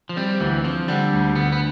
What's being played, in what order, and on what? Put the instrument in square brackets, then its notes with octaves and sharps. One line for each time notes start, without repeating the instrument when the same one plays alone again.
[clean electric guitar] F3
[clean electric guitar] G3 [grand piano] C4
[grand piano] D2 [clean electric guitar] E3
[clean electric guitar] F3 [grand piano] C4
[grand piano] D3 [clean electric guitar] G3
[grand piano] D2
[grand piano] D3 [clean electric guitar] B3
[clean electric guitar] B3